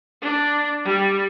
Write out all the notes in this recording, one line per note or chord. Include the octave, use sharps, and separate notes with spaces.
D4
G3